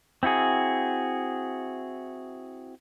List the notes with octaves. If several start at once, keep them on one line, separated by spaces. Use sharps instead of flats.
C4 E4 F#4 G#4